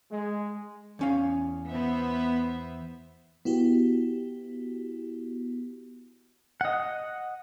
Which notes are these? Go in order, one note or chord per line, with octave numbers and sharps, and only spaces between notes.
G#3
E2 C#4 F5
B3 C5 E5
B3 E4 F#4 G4
D#5 F#5